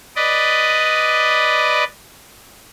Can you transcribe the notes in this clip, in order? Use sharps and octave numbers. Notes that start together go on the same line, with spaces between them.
B4 D5 D#5